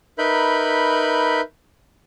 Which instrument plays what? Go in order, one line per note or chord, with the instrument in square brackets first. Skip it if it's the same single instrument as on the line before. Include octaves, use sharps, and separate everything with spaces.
[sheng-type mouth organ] D#4 A#4 B4 E5 B5 G6